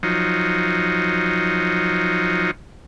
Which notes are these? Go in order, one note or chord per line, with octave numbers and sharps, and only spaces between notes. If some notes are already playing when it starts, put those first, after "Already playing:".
F3 F#3 D#4